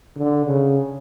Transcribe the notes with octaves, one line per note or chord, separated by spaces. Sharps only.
D3
C#3